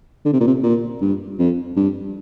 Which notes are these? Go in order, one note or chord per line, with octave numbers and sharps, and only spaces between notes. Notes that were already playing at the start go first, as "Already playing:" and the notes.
D3
C3
A#2
C3
A#2
G2
F2
G2